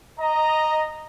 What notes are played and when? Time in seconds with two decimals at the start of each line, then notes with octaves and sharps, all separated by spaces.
0.19 D#5 A#5